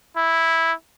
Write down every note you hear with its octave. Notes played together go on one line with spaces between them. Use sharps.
E4